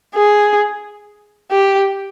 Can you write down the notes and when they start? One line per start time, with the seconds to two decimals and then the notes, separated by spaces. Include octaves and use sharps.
0.15 G#4
1.51 G4